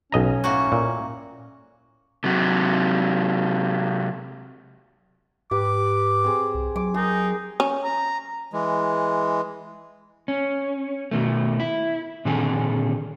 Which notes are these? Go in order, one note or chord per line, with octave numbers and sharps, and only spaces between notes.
B1 C#4 D#5 A#5
A2 A#3 F#4
A#2
C3 F#3
G#2 G4 B4 D6
C4 G#4
C2
F#3 D6
D#4 G#4 A#4
C#4
A#5
E3 G#3
C#4
B2 D#3 A3
E4
A#2 D3 D#3 C4 G#4 A4